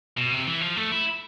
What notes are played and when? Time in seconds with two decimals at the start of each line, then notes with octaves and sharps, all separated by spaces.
0.18 B2
0.32 C3
0.47 E3
0.61 F3
0.77 A3
0.91 E4